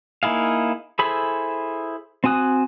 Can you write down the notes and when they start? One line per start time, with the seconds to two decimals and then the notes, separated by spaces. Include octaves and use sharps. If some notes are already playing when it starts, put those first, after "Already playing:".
0.23 A#3 D#4 E4 G#4 F5
0.99 E4 G#4 A4 C5 B5
2.24 C4 F#4 G#5 D#6 F#6